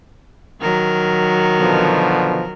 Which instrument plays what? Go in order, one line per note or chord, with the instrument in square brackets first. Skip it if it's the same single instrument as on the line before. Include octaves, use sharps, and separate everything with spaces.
[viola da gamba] D#3 F#3 A#4
[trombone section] B2 D3 F3